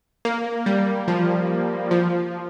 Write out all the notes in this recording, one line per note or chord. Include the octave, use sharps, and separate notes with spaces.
A#3
G3
F3
F3